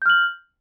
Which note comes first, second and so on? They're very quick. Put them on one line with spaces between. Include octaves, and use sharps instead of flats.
G6 F6 F#7